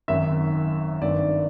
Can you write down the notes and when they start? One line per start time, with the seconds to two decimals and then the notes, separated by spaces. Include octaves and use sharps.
0.08 G#1 F#2 D#3 E5
1.02 G#1 G2 D#3 D5